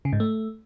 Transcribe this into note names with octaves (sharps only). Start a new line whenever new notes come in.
C#3
G#2
A3